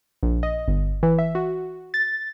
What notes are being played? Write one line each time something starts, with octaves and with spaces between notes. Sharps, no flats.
A#1
D#5
G1
E3
E5
F#4
A6